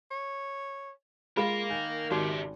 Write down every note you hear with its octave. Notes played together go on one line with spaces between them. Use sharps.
C#5
G#3 F4 A#4 F5 B5
D#3 G#5
G#1 C#3 D#4 F#4 G4